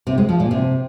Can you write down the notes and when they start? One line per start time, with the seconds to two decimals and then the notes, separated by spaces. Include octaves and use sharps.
0.07 C3
0.18 G#3
0.29 F3
0.40 A#2
0.51 C3